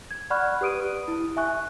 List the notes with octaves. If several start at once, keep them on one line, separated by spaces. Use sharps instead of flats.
G#6
D5 F#5 B5 C#6 F6 F#6
G4 B4 D#6 D7 D#7
E4
E5 G#5 C#6 F#6